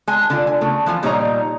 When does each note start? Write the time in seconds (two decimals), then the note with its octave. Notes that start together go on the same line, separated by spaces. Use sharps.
0.07 G#3 G#5
0.30 D3 D4 F4
0.47 G#5
0.61 C#3 A3
0.86 E3 F3 F4 G#5
1.03 A#2 G3 D#4 C#5 D#5 A#5